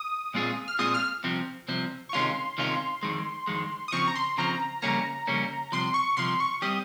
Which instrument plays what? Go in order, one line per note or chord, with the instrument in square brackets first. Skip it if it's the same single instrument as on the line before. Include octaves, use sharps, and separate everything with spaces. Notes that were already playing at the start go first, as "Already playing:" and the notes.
Already playing: [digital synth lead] D#6
[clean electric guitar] A#2 G#3 C4 F4 G#4
[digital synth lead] F6
[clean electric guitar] A#2 G#3 C4 F4 G#4 [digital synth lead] D#6
[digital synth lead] F6
[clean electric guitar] C2 C3 F3 C4
C2 C3 F3 C4
[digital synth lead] C#6
[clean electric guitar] C3 D#3 G#3 C#4 F4 [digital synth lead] C6
[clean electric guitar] C3 D#3 G#3 C#4 F4
F2 D#3 G#3
F2 D#3 G#3
[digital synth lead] D#6
[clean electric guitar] C#3 F3 C4 [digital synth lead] C#6
[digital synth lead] A#5
C6
[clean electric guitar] C#3 F3 C4 [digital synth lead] A#5
[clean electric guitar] F2 C#3 G3 A#3 C#4 [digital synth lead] A#5
[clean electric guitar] F2 C#3 G3 A#3 C#4
[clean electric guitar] C2 C3 F3 [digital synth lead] C6
[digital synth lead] C#6
[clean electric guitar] C2 C3 F3 [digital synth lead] C6
[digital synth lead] C#6
[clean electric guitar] G3 C4 G4 [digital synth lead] D#6